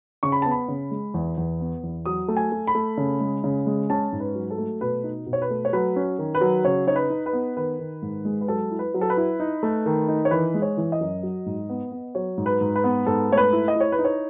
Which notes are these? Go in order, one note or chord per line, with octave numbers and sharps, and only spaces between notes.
C#3 C#6
B5
B3 A5
B5
C#3
G#3
E2
E2
B3
E2
F#3 D#6
A3
G#5
A3
B5
A3
C#3
G#3
C#3
G#3
C#4 A5
G#2
B4
F#3
A4
A3
B2 B4
D#4
B2
C#5
B4
A3
C#5
F#3 B4
C#4
D#3
B4
F#3
C#3 C#5
D#4 C#5
B4
D#4
B4
B3
D#3 B4
D#3
G#2
G#3
B4
F#3 A4
E4
B4
F#3
A4
B4
E4
D#4
A3
D#3
D#4
C#5
E3 B4
G#3
C#5
E3
D#5
F#2
F#3
G#2
B3
B3
F#3 C#5
G#2
B4
G#2
B4
B3
G#2 A4
A3 C#5
B4
E4
D#5
E4
C#5
B4
D#4
C#5